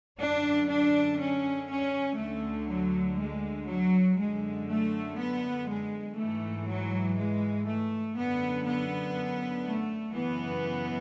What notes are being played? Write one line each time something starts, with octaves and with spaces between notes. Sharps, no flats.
F#2 D3 D4
D4
C#4
C#4
D2 D3 A3
F#3
G#3
F#3
F#2 D3 G#3
A3
B3
G#3
G#2 E3 A3
F#3
G#3
A3
F#2 D3 B3
B3
A3
F#2 C#3 E3 B3